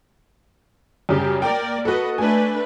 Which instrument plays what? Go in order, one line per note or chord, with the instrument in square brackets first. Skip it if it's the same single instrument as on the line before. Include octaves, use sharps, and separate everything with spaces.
[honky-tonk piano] F#2 C#3 G3 [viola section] G4
[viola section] A#3 A#4 D5 [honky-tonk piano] G5
[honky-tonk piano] F#4 A4 [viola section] B4 D#5
[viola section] A3 D4 B4 [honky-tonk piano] G#5